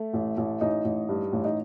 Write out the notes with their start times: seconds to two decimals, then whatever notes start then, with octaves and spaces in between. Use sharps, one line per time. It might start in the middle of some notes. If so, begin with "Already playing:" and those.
Already playing: A3
0.13 A1
0.37 A1
0.61 A1 D#4
0.85 A1
1.09 G2
1.32 A1
1.44 D#4